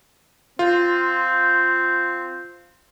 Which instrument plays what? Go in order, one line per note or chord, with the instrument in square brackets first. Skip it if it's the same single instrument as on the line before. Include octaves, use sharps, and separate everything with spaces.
[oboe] C4 [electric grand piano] F4